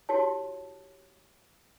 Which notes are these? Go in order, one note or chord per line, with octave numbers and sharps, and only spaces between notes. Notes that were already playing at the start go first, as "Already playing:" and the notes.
E4 F#4 G4 C#5 A5